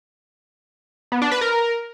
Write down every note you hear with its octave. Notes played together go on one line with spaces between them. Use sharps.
B3
D4
B4
A#4